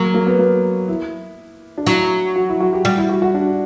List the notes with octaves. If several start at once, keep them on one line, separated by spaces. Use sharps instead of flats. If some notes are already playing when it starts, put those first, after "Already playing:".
Already playing: F#3 A#3
A#3
B3
A#3
E4
D4
F#3 E4
F#4
E4
F#4
G4
G3 F#4
E4
F#4
F#4
D4